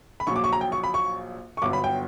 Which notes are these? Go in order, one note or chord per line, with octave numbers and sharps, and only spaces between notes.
B5
A#1 A#2 F#3 C#6
D6
C#6
A#5
G5
C#6
B5
C#6
C#6
G1 G2 F#3 B3 D6
B5
G5